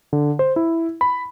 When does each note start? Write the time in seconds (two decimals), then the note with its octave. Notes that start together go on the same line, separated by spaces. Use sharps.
0.13 D3
0.39 C5
0.56 E4
1.01 B5